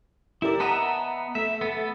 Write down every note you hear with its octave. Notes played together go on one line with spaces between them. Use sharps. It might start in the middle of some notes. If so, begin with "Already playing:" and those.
E4 G4 A#4 D5
B3 D#5 E5 F#5 A5 A#5
A3 E5
B3 A4